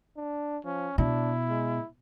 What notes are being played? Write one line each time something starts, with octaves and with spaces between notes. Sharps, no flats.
D4
F3 C#4
B2 D4 E4
G#3